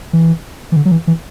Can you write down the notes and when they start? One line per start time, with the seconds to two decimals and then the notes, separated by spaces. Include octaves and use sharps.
0.13 E3
0.72 E3
0.76 D3
0.85 F#3
0.92 E3
1.07 E3